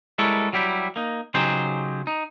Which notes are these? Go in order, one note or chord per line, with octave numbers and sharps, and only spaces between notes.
G3 G#3 E4 A4 A#4 C#5
F#3 G3 E4 G4
A#3 D#4
C#3 F#3 D#4 G4 G#4 C5
D#4